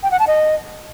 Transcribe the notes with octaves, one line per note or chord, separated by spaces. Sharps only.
G5
F#5
A5
D#5